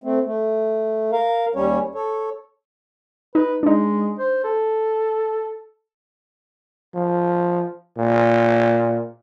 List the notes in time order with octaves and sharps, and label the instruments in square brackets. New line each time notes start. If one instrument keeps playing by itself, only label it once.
[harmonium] A3 C4
A3
A#4 F5
D#2 G3 C#4 C#5
A4 C#5
[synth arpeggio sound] D#4 [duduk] B4
[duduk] G#3 [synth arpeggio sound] D4 D#4
[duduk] C5
A4
[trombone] F3
A#2